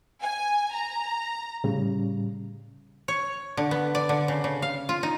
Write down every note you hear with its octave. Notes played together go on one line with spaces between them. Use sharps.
G#5
A#5
A2 C#3 G3
C#5
D3
B3
D5
D3
C#3
C#3
F5
F4
D#4